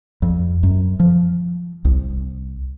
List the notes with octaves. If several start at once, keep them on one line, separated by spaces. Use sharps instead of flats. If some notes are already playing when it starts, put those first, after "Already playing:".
F2
F#2
F3
C2